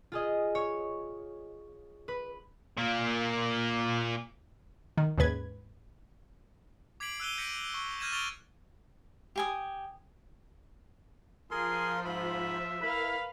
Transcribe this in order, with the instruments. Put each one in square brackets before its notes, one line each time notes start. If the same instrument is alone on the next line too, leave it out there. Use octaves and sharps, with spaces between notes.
[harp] F4 G#4 D#5
C#5
B4
[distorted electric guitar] A#2 A#3
[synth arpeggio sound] D#3
D#2 G#2 C#3 B4 G#6
[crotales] D6 G#6 B6 C7 D7 F#7
E6 F#6 D#7 G7
G6 A#6 B6 C#7 D7
C#6
F6 G6 G#6 A#6 D#7 E7
C#6 F6 A6 D7 F7 G7
[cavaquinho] G4 G#5 D#6
[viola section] F3 F4 C5 [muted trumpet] G#4 [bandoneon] A#4 C6
[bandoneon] G#2 B5 [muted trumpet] E5
[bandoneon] E4 [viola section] A#4 B4 F5 [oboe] B5